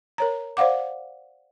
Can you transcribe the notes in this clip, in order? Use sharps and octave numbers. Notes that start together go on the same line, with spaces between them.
A#4 C#5 A#5
C5 D5 F5 F#5 D6